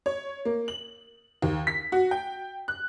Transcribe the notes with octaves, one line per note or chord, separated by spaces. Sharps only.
C#5
A#3
F#7
D#2
B6
F#4
G5
F#6